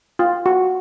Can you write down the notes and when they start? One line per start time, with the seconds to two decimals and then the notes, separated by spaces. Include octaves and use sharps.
0.19 F4
0.46 F#4